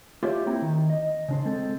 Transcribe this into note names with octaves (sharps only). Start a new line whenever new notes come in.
F4 G4 C5 C#5 E5 F5
A#3 C4 E4 G5 A#5
D#3
D#5
C#3 D4 C5
G#3 C4 A4